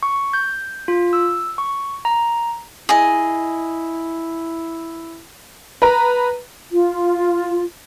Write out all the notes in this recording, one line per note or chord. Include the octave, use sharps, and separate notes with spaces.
C#6
G6
F4
E6
C#6
A#5
E4 G#4 D#5
B4 A#5
F4